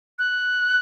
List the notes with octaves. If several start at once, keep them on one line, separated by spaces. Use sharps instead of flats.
F#6